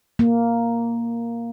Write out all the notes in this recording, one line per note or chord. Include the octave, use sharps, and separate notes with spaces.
A#3